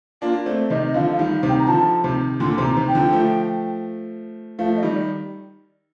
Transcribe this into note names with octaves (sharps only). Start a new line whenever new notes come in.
A#3 D4 F4
A3 C4 D5
C3 D#3 D#5
D#5
D3 F3 F5
F5
D#3 G3
F5
C3 D#3
G5
A#5
D3 F3 A5
C3 D#3
A#2 D3 C6
C3 D#3
A#5
C3 D#3
G5
D3 F3
F3 A3
F3 A3 F5
D#5
D#3 G3
D5